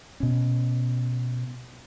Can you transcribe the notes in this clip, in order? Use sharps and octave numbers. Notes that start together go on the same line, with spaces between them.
B2 C#4